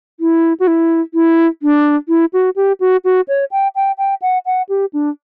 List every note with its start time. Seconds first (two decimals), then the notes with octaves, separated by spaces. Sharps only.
0.20 E4
0.60 F#4
0.67 E4
1.14 E4
1.63 D4
2.09 E4
2.33 F#4
2.56 G4
2.80 F#4
3.05 F#4
3.28 C#5
3.51 G5
3.75 G5
3.98 G5
4.22 F#5
4.46 F#5
4.69 G4
4.93 D4